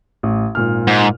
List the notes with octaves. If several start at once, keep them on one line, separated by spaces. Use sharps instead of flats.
A1
G#1 A#2 F6
G#2